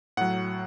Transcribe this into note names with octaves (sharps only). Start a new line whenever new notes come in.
A2 F#3 F#5